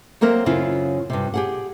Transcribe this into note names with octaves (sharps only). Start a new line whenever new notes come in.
F#3 A#3 C4 A#4 E5
F#2 C#3 C4 E4 F4
G2 C3
G4 G#4 F#5